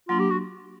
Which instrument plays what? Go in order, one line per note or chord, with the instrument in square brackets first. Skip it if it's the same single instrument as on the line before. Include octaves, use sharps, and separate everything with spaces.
[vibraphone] F#3 A#3 D4 [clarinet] F4
[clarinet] G4
F#4